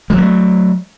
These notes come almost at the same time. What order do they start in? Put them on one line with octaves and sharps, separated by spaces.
G3 F#3 A#3 A3